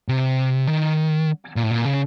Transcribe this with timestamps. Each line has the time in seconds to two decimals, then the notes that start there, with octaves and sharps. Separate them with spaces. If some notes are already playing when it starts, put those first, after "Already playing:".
0.08 C3
0.67 D#3
1.56 A#2
1.63 A2
1.71 A#2
1.85 C#3